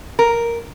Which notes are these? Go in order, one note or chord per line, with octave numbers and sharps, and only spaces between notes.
A#4